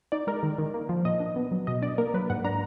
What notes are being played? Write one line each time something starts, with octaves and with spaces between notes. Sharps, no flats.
D#4 D5
G#3 A#4
D#3
D#3
A#3
F3
A#2 D#5
D4
B3
F#3
B2 D#5
D4 D5
A#3 A#4
F#3 B4
G#2 F#5
D4 A#5